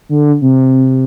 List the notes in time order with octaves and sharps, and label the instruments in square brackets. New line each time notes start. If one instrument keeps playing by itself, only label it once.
[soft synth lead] D3
C3